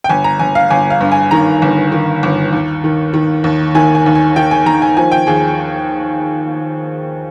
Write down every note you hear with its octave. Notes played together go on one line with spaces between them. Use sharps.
G5
G1 G#5
A#5
G1 G#5
F5
G1 G#5
F5
G2
G#5
D#3 A#5
G1
D#3
G1
D#2
D#3
D#3
D#2
D#3 G#5
G#5
D#2
G#5
D#3 G5
G#5
D#3 A#5
G#5
F3 G#5
G5
D#2 G#4